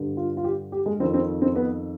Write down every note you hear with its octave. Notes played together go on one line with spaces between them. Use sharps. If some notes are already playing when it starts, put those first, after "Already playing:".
Already playing: G2 D3
F4
F4
G4
G4
G#3
F2 D#3 C4
C4
C4
B3